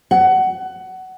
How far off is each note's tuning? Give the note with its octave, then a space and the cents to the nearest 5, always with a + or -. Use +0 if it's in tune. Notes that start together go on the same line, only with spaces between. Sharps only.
F#5 +20